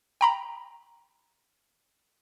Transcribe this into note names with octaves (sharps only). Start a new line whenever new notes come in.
G5 A#5 B5